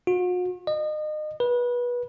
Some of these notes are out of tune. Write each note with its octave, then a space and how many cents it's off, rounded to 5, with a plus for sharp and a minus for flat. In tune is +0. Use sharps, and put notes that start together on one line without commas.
F#4 -45
D#5 -30
B4 -25